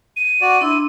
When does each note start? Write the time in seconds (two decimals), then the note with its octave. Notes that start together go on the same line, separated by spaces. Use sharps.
0.16 D#7
0.41 F#4 D5
0.61 D4 E4 C6